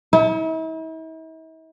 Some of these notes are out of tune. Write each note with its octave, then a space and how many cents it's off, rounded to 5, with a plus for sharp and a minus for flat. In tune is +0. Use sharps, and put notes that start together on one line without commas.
E4 -45